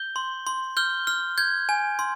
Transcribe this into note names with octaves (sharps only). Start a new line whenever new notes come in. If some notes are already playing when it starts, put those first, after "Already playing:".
Already playing: G6 G7
C6
C6
F6 G6 G7
F6
G6 G#6
G#5
C6